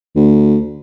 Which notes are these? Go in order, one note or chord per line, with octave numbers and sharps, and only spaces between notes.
D2